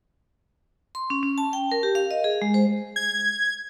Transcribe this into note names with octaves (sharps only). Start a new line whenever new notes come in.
C6
C#4
C#4
A5
G5
A#4
G4
F5
D#5
G#4
G#3
C5
G#6